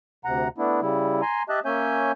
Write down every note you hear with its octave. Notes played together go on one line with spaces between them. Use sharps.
D2 C3 F#5 A#5
A3 B3 D4 E4
C#3 G3 E4
G#5 A#5 C6
G4 D#5 E5 A5 F#6
A#3 C#4 C#5 E5 G#5 G6